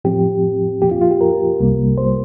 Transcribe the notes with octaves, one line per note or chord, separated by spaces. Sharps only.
A2 F3 C4 G4
A#2 F3 A#3 G4
F4
F4
G4
A#4
C2 C3 G3 A#3
C5